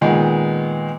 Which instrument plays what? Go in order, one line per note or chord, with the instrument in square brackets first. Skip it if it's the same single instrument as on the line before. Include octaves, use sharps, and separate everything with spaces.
[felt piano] A#2 D#3 G#3 B3